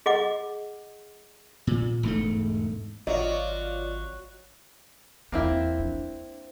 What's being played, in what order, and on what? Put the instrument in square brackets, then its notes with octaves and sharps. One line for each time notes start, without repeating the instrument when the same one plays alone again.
[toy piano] G#4 D#5 F#5 D6
[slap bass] A#2
E1 G#2 A3
[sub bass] G#1 [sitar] F#3 [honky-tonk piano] F4 D5 [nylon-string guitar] D#5
[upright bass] E2 E3 [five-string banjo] A#3 C4 E4
[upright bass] D4